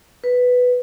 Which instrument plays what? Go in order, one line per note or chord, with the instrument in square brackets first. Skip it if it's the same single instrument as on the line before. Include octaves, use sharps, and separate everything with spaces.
[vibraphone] B4